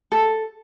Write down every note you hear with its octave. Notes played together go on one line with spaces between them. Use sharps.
A4